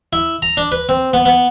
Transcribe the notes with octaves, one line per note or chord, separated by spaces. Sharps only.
E4
A#5
D4
B4
C4
B3
B3